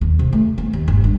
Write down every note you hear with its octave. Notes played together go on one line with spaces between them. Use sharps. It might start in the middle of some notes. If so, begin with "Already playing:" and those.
D#2
C3
A3
B3
D#2
G1
G2